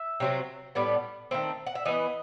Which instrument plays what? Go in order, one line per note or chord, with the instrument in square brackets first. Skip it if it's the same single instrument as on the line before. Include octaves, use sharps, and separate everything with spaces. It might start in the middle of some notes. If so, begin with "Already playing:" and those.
Already playing: [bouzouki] E5
C3 F#3 C4
A2 G3 B3
D#3 A3 C4
F#5
E5
E3 B3 D#5